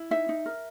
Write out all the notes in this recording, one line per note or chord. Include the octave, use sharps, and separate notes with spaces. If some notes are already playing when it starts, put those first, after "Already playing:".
Already playing: E4
D#4 E5
D#4
A#4